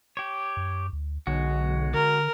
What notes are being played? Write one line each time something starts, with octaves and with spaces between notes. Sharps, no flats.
G4 C#5
F#2
D2
B1 D3 G#3 F#4
D3 A#4